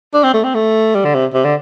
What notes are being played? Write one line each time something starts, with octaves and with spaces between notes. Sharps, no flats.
D4
C4
A3
C4
A3
G3
D3
C3
C3
D3